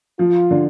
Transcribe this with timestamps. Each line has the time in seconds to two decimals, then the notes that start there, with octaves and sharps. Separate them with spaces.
0.19 F3 F4
0.51 D3